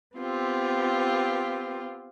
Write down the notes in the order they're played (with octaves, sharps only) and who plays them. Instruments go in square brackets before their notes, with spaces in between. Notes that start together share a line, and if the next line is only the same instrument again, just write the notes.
[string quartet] B3 C4 F4 G4